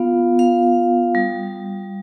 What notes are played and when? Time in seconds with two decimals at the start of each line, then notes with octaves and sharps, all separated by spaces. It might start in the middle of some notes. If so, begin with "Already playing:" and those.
Already playing: B3 F4 F5
0.39 F5
1.15 G3